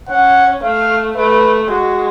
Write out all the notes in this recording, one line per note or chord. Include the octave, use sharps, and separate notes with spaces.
C#4 F#5
A3 F5
A3 B4
G#3 F#4